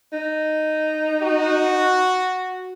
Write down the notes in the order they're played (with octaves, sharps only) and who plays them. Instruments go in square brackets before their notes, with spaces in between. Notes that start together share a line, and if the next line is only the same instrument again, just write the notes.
[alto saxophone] D#4
[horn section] F#4